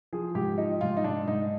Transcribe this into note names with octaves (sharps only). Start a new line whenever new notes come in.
F3 G#4
G#2 G4
F3 D#4
G#2 F4
D#4
G#2 D4
G#2 D#4